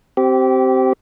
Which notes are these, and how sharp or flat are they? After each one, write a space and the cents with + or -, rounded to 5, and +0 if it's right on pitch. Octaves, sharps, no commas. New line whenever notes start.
C4 +0 G4 -25